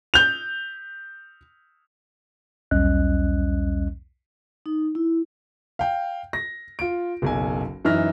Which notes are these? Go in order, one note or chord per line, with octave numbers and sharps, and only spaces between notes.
G6 F7
B1 E2 G3 C#4 D#5 F#6
D#4
E4
F5 G5
A#6
F4 D7
F#1 B1 G#5
F#2 E3 D#4 E5 F6 A#6